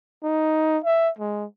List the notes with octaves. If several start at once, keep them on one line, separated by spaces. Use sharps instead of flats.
D#4
E5
G#3